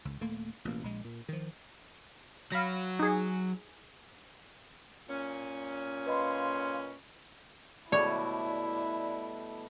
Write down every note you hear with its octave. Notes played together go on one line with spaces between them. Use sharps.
C#2
D#1 A3 A#3
A1 B2 A#3
A#1 G#3
A#2
D#3 F3
F#3 F5 B5 A#6
D#4 G#4
A#2 C#4
B4 D#5 F5 B5 C6
B2 G3 A3 E4 C#5 D5